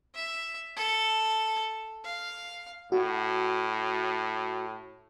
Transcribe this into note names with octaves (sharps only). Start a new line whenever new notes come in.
E5
A4
F5
A2 F#4